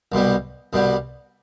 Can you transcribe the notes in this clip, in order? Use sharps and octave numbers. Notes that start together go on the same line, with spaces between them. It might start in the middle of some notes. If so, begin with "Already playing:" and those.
C2 B2 G3
C2 B2 G3